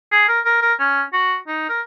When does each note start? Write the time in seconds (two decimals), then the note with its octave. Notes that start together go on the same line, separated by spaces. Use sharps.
0.12 G#4
0.28 A#4
0.45 A#4
0.62 A#4
0.79 C#4
1.13 F#4
1.47 D#4
1.69 A#4